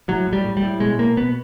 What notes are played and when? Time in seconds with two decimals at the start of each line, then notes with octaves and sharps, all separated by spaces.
0.08 A2 F#3
0.27 A2
0.33 G3
0.45 A2
0.57 G3
0.63 A2
0.80 B2 G#3
0.98 B2 A#3
1.17 B2 B3